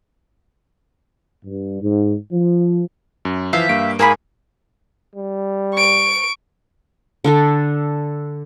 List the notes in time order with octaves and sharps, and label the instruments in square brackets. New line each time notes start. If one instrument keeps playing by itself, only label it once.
[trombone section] G2
G#2
F3
[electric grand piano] F#2
[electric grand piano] E3 F3 [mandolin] E5 F5 G5
[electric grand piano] G2 A#3 D7
[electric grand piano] G#2 A#4 G#5 [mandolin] A#3 G#4 B5
[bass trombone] G3
[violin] C#6 D7
[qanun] D3 D4 A4